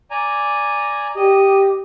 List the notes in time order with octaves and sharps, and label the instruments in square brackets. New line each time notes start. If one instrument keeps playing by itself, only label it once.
[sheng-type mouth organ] D5 G#5 A#5
[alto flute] G4 [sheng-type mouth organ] D#5